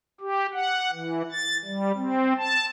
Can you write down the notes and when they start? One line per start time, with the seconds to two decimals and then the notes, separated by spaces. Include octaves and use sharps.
0.21 G4
0.53 F#5
0.92 E3
1.32 A6
1.65 G3
1.96 C4
2.38 A5